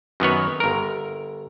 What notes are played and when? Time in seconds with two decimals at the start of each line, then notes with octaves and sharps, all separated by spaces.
0.20 F#2 D#3 B3 C#5
0.60 G1 A#4